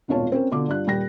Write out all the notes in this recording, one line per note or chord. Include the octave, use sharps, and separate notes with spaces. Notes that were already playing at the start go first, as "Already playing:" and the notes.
D#1 G#1 B2 F4 C#5 A5
C4 C#4 A#4
B2 D3 F4 D6
G2 F4 F#6
D#1 G3 G5 A#6